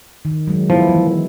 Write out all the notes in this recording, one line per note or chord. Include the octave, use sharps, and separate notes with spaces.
D#3
F#3 G#3
F3 B3 E4
E3 B3